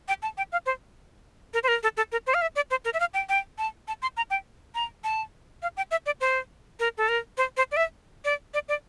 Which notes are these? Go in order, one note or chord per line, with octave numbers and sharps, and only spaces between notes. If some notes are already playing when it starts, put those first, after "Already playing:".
G5
A5
G5
F5
C5
A#4
C5
A#4
A4
A4
A#4
C5
F5
E5
D5
C5
A#4
E5
F5
G5
G5
A5
A5
C6
A#5
G5
A#5
A5
F5
G5
E5
D5
C5
A#4
A4
A#4
C5
C5
D5
E5
D5
D5
D5